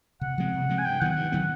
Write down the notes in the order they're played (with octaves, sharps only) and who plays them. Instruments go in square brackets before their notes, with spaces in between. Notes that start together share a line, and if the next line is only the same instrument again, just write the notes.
[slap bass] C3 [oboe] F#5
[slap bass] F3 G#3 C4
C3
F3 G#3 C4
[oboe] G#5
[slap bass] G2 [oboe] G5
[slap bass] D#3 F#3 B3 [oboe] F#5
[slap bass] G2
D#3 F#3 B3